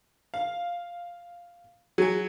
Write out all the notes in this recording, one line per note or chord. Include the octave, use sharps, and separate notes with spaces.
F5
F#3 G#4 G#5